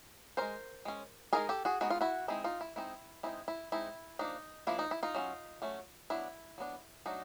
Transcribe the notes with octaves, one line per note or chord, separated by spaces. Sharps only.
G#3 C#4 A#4 C5
G#3 C#4
G#3 B3 D#4 G#4 A#4
G4 A4
F#4 G#4
G#3 B3 D#4 F#4
F4
E4 F#4
G#3 C4 D#4 E4
D#4 F4
E4
G#3 C4 D#4 E4
G#3 C4 D#4 E4
E4
G#3 C4 D#4 E4
F3 A#3 D4 D#4
F3 A#3 D4 E4
D#4
E4
D#4 F4
F#3 A3 C#4
F#3 A3 C#4
F#3 B3 D4 E4
F#3 B3 D4
F#3 A3 D4 D#4